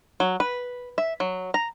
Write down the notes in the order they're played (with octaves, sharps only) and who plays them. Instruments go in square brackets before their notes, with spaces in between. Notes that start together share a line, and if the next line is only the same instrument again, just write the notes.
[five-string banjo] F#3
B4
E5
F#3
A#5